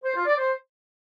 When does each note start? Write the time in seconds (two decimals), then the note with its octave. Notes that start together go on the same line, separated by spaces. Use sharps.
0.04 C5
0.15 F4
0.26 D5
0.38 C5